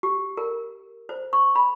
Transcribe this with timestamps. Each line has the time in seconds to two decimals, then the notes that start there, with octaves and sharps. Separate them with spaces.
0.03 G4
0.37 A#4
1.09 C5
1.33 C#6
1.55 B5